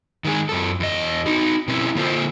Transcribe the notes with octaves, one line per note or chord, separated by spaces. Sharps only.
D#3 G#3 G#4
F#2 A4
E2 D#5
D#4 F#4
B2 C4 C#4 D#4 E4
D3 A#3 F4 A4 C5